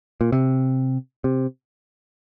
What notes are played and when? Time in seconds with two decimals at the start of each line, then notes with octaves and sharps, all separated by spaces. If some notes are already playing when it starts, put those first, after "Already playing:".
0.21 A#2
0.32 C3
1.24 C3